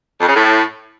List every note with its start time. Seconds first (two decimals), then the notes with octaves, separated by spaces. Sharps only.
0.20 F2
0.28 C#3
0.35 A2